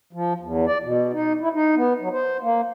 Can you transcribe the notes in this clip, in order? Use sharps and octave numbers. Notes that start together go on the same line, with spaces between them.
F3
E2
D5
B2
D#4
E4
D#4
B3
F#3
C5
A#3